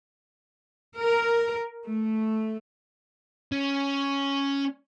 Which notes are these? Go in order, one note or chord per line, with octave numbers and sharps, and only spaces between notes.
A#4
A3
C#4